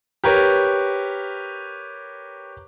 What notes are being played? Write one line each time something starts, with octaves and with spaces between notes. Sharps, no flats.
G4 A#4 B4 C#5